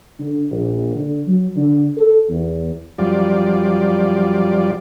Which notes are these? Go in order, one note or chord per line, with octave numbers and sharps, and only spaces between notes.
D3
A#1
D3
F#3
D3
A4
E2
F#2 F3 G3 F4 D5